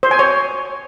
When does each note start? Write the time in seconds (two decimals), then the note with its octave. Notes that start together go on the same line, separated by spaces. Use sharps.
0.03 C5
0.11 G#5
0.19 C#5